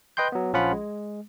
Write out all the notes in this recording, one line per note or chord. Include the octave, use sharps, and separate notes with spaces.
B4 D#5 G5 C6 G6
F#3 B3
A#1 F3 C#4 F4 F#5 B5
G#3